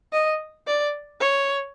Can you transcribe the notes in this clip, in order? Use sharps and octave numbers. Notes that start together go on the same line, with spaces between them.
D#5
D5
C#5